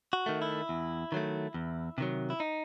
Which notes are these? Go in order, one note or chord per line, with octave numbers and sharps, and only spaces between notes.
F#4
D#3 A3
E4
E2
D#3 F#3 A3
E2
C3 D#3 F#3
E4
D#4